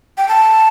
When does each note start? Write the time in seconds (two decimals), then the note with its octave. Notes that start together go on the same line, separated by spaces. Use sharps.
0.18 G5
0.28 A5